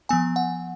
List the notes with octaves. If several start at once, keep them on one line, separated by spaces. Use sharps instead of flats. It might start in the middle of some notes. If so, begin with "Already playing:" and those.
F3 B3 G#5
F#5